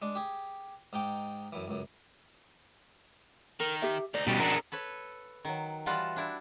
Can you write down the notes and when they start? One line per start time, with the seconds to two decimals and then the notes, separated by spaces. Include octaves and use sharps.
0.02 G#3 D4
0.15 G4 G#4
0.93 G#2 D#4 G5 D6
1.53 F#2 E3
1.68 C#2 F#2
3.60 D#3 A#4
3.82 G4 E5
4.14 D2 D#4 D5
4.27 B2 G3 C#4 F#4 G4
4.40 G#3 D4 A4 A#4
4.72 A4 B4 C#5
5.45 D#3 F#3
5.86 E3 G3 F4 F#4 F#5 A5
6.16 D4 E4